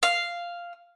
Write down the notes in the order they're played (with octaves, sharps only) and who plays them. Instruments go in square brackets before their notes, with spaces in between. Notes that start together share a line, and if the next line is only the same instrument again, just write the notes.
[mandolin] F5